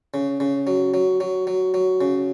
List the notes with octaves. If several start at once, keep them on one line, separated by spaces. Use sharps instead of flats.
C#3
C#3
F#3
F#3
F#3
F#3
F#3
C#3